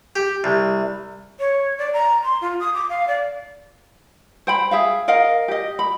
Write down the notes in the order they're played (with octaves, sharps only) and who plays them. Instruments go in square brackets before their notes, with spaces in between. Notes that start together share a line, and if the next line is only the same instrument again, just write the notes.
[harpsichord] G4
C2
[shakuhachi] C#5
D5
A#5
C6
F4
D#6
D6
F5
D5
[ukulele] C5 G5 B5
G#4 E5 F5
A#4 D#5 F5
G4 D#5
B5